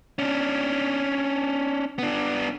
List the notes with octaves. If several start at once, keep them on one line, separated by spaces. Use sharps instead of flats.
C#4 D4
B3 D4